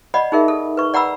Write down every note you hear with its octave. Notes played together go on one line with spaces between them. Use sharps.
D5 D#5 F#5 B5
D#4 G#4 A#4 E5
A4
B4 C#6
D5 F#5 A#5 B5 E6